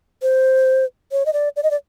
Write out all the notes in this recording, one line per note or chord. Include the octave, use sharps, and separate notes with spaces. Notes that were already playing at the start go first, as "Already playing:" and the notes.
C5
C#5
D#5
D5
D5
D#5
D5